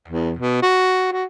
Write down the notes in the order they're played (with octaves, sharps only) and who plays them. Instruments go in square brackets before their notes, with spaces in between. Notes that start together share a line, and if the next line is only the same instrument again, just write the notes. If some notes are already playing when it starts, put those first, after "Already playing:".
[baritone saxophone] E2
B2
F#4
F#4